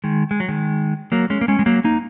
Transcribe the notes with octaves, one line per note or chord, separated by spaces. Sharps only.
D#3 G#3
G#3
F#3
D#3 G#3
F#3 A#3
G#3 C#4
A#3
G#3 C#4
G#3
F#3 A#3
A#3 D#4